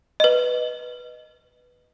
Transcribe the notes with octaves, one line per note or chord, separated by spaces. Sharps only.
B4 D#5